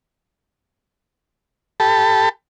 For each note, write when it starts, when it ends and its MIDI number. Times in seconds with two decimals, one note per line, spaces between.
1.80 2.29 67
1.80 2.29 69
1.80 2.29 81
1.80 2.29 83